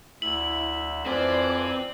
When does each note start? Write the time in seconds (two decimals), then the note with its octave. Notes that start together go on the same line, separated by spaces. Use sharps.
0.22 D2 E4 E5 F#7
1.06 F2 E3 C4 F4 B4 D5 G#5